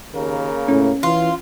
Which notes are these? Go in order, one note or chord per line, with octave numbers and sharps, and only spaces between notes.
D#2 C#3 A#3 A#4
A2 C#4
E3 F4